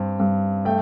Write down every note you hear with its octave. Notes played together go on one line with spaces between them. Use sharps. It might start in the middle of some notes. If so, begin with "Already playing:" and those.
Already playing: G2 C4
G2
A3 G5